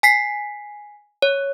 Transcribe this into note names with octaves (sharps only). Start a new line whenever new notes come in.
G#5 B6 C7
C#5